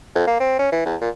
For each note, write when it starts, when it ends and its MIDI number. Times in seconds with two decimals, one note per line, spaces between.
0.15 0.25 41
0.27 0.38 58
0.40 0.57 60
0.59 0.68 61
0.72 0.81 52
0.85 0.96 40
1.01 1.09 46